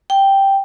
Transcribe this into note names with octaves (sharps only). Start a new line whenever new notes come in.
G5